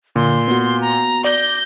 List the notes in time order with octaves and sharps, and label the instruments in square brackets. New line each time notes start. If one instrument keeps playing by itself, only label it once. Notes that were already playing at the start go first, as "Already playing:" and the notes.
[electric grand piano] A#2 [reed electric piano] D3 [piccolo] C6
[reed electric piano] B3 F#4
[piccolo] A#5
[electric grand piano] D5 [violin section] G6 [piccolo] A#6